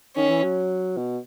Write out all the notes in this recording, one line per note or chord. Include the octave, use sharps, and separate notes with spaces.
D#3 C#4
E3
F#3
B2